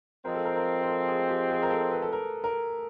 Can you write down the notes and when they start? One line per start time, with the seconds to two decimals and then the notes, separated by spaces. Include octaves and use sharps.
0.24 F3 G#3 C4 A#4
0.34 A4
0.45 A#4
0.56 A#4
0.83 A#4
0.87 A4
1.08 G#4
1.29 G4
1.50 G#4
1.63 A#4
1.70 A4
1.91 B4
2.02 A4
2.13 A#4
2.44 A#4